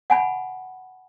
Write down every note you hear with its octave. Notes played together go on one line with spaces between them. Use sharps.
F#5 G#5 B5